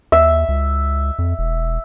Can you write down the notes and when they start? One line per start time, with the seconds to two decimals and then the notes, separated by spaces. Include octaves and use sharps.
0.12 D#2 E5
0.49 C#2
1.19 F2
1.39 E1